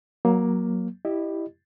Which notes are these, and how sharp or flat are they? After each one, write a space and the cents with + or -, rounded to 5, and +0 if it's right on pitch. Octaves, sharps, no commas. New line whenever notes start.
F#3 +0 A#3 +15
E4 +0 G4 +0 D#5 -30